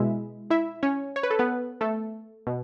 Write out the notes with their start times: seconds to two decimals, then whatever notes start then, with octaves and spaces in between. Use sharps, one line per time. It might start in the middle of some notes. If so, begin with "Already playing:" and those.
Already playing: B2 G#3 E4 E5
0.50 E4 E5
0.83 C#4 C#5
1.16 C#5
1.23 B4
1.31 A4
1.39 B3 B4
1.81 A3 A4
2.47 B2